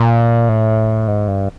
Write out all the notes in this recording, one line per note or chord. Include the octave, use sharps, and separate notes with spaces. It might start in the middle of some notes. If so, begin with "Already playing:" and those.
Already playing: A#2
A2
G#2
G2